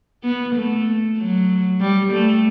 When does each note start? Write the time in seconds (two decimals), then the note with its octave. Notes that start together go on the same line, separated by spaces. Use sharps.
0.23 B3
0.55 A3
1.18 F#3
1.81 G3
2.13 A3